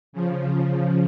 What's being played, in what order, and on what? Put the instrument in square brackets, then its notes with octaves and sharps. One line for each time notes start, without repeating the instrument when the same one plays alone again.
[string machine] C#3 F3